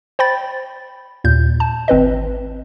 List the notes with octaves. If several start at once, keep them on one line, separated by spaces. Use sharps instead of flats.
C5 G5 B5 A6
D#2 A#2 G6
A5
G#1 C4 B4 D#5